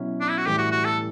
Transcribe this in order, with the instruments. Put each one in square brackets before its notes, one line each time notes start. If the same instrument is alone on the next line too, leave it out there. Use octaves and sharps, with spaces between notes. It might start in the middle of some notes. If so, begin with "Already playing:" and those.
Already playing: [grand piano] B2 F#3 C#4 E4
[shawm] D4
E4
F#4
[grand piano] A2 E3 G3 [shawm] G4
[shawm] F#4
F#4
A4